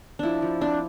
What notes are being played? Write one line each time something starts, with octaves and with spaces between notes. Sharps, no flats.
F3 D4 E4
F3
C4 D4